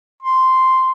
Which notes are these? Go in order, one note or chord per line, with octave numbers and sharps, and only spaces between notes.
C6